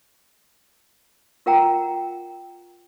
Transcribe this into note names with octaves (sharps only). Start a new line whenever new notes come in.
F4 A#4 F#5 G5 A#5